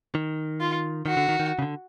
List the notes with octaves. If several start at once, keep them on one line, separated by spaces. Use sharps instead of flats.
D#3
F4
D#3 F#4
D3
D#3
D#3
C#3
D3